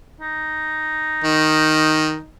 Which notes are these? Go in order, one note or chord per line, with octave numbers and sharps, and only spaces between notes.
D#4
D#3